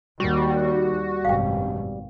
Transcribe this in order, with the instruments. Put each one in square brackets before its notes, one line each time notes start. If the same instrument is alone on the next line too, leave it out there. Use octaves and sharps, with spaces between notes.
[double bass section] D#2 [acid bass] G3 [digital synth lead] F#4
[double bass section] G#1 F#2 B2 [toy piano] F5 G5